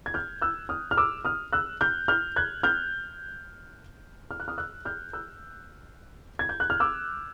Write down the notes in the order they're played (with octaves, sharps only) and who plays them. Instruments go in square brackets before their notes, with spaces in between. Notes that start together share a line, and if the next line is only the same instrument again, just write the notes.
[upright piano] G#6
F6 G6
E6 F#6
D#6 F6
F6
D6 E6
D#6 F6
E6 F#6
F6 G6
F6 G6
F#6 G#6
F6 G6
F6
F#6
D#6 F6
E6 F#6
F6 G6
E6 F#6
G#6
G6
F#6
F6
D6 E6